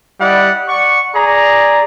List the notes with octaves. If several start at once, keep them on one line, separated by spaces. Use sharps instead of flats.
G3 E4 D5 D#5 F#5
D5 F#5 C#6
G#4 D5 A#5